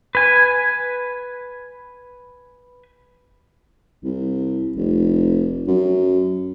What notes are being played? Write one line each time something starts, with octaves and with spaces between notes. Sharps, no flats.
B4 G#5
C2
F1
F#2